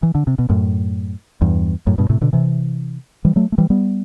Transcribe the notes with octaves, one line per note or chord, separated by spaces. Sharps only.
E3
D3
C3
B2
F#2 A2
E2 G2
F#2 A2
G2 B2
A2 C3
B2 D3
C3 E3
E3 G3
F#3 A3
A3
E3 G3
G3 B3